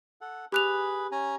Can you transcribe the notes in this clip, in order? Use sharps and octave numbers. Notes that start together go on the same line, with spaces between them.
A4 F#5
G4 G#4 B4 B5 F#6 F7
C#4 G#5 A#5